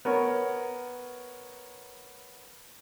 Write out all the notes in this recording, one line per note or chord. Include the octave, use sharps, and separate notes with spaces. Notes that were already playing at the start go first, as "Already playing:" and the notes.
B3 A#4 C#5